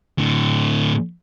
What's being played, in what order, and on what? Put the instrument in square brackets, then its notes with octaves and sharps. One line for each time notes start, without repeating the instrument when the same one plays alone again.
[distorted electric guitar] A2 D3